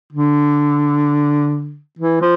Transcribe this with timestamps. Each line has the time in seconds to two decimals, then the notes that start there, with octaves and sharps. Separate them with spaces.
0.13 D3
1.99 E3
2.21 F3